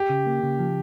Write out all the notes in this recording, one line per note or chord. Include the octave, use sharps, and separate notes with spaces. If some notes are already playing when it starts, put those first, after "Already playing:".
Already playing: G4
C#3
A#3
C#3
F3